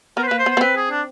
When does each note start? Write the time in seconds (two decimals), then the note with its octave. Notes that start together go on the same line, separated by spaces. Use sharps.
0.17 B3 A#4
0.23 C5
0.27 A#3 B4
0.39 C5
0.46 B3
0.50 C5
0.57 B3
0.61 C4 B4
0.76 G#4
0.90 D4